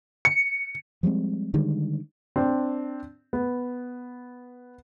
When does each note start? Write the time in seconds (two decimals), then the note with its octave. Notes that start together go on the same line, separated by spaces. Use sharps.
0.25 C#7
1.03 F3 G3 G#3 C4
1.54 D3 D#3 G3 G#3
2.36 C4 D4
3.33 B3